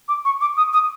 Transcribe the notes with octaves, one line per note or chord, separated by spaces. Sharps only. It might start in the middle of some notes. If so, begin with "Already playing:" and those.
D6
C#6
D6
D#6
D#6